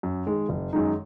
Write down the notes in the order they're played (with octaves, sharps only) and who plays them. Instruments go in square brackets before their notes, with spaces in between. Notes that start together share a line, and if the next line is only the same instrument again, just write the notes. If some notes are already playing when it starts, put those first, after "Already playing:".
[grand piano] F#2
D#3 G#3
F#1
F#2 D#3 G#3 D#4